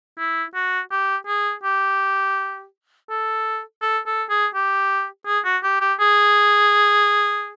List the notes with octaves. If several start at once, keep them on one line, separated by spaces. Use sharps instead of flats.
E4
F#4
G4
G#4
G4
A4
A4
A4
G#4
G4
G#4
F#4
G4
G4
G#4